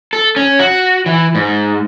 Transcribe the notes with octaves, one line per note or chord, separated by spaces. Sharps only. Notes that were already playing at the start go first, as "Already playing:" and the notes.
A4
C#4
F#4
E3
G#2